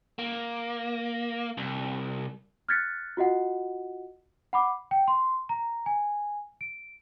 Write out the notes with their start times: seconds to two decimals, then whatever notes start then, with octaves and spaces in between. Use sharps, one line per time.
0.19 A#3
1.58 C2
2.69 F6 F#6 G#6 A6 B6 C#7
3.17 F4 F#4 D#5 F#5
4.53 F#5 B5 D6
4.91 G5
5.08 C6
5.49 A#5
5.86 G#5
6.61 D7